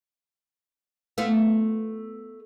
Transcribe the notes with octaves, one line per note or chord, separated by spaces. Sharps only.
A3 B3 F4